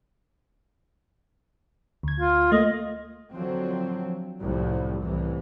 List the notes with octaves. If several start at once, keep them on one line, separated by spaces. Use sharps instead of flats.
D2 G#6
F4
A3 A#3 D#5
D3 F3 F#3 C4
C2 F#2 A2 F3
C2 A2 E3